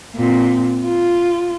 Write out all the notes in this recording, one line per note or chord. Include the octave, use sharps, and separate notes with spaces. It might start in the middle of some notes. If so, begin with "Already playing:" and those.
A#2 C4
F4